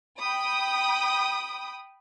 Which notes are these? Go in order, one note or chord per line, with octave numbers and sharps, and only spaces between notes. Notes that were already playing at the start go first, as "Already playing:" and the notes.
G5 B5 D#6